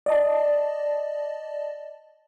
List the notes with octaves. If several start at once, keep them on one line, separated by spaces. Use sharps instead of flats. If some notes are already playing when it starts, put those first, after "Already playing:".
D5 D#5 A5